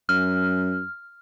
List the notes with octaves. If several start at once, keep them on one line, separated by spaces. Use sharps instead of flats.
F#2 F6